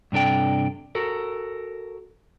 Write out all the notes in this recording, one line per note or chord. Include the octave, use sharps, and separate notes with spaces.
G2 C3 D4 A4 G5
F#4 A4 A#4